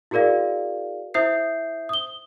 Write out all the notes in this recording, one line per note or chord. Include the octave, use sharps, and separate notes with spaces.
E4 F#4 G#4 A#4 D5 F5
E4 C5 E5 D#6 G6 C7
D#6 G7